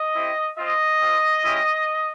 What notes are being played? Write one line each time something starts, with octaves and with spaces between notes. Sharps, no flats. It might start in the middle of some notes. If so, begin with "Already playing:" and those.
Already playing: D#5
C4 E4 G4
C4 F4 D#5
C4 F4
G#3 C#4 E4 G4